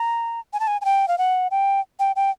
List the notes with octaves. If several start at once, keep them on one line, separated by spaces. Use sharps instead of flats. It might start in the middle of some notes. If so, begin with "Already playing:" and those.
Already playing: A#5
G#5
A5
G#5
G#5
G5
F5
F#5
G5
G5
G5